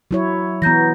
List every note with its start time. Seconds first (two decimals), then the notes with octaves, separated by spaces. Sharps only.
0.11 F#3 E4 C#5
0.62 E3 B3 A#5 G6 A#6